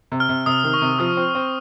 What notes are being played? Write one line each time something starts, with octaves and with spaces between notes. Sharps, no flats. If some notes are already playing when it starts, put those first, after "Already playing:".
C3
F6
C3
C3 D#6
D#3
C#6
C3
F3 D#6
C4
C4